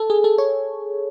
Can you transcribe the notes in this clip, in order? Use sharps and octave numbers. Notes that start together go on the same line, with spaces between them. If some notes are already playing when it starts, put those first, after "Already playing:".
Already playing: A4
G#4
A4
C#5